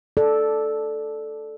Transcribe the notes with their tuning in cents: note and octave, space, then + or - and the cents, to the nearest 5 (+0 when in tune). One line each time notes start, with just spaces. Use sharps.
A4 -5 D5 +5